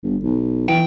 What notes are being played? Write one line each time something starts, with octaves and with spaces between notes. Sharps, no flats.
G1
B1
E3 G5